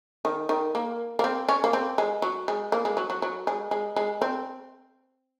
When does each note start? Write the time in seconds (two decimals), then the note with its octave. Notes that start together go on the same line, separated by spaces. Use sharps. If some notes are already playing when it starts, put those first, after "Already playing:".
0.25 D#3
0.49 D#3
0.75 A#3
1.19 A#3
1.24 C4
1.49 C#4
1.64 A#3
1.73 C4
1.98 G#3
2.22 F#3
2.48 G#3
2.72 A#3
2.85 G#3
2.97 F#3
3.10 F#3
3.22 F#3
3.47 G#3
3.71 G#3
3.96 G#3
4.22 C4